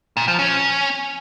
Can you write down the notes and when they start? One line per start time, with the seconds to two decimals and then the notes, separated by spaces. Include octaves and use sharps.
0.17 A#2
0.28 F3
0.39 C#4